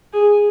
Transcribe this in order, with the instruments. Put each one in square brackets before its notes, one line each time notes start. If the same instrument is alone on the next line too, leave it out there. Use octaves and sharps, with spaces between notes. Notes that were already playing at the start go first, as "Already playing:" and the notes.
[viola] G#4